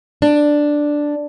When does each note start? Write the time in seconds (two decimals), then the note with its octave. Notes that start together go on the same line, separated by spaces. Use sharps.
0.22 D4